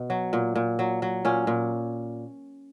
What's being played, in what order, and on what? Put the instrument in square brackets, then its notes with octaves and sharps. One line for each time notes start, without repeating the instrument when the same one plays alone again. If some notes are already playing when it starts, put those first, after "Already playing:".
Already playing: [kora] B2
F#3
A#2
A#2
F#3
F#3
A#2 C#4
A#2